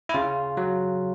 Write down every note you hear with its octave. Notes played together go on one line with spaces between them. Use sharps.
E4
C#3 F4
F#3